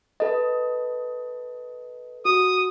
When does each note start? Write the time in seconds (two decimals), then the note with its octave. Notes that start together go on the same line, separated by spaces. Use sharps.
0.20 A4 B4 D#5
2.25 F#4 D#6